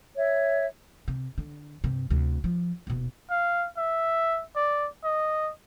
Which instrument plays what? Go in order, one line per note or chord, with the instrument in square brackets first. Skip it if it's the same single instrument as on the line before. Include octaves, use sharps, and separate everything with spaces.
[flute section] C#5 E5
[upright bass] C3
D3
G2 C3
D2 C3
F3
D#1 B2
[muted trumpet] F5
E5
D5
D#5